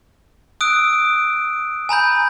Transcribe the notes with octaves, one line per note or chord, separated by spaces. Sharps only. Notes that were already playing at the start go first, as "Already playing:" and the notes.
D#6 E6 F#6 D7
G#5 A#5 B5 G6